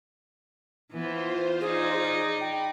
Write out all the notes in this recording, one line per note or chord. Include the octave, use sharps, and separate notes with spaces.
E3 B3 F4 C5
D#4 G#4 D5
G#4
G5 B5